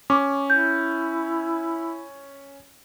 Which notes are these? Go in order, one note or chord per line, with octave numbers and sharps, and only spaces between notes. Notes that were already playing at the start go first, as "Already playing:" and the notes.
C#4 C#6 D6
E4 G6